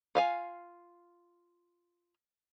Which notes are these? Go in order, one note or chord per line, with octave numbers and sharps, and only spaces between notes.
F4 F5 G#5